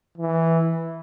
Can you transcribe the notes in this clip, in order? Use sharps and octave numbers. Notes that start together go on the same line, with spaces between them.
E3